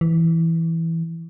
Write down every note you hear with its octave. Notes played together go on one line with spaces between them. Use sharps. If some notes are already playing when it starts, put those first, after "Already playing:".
E3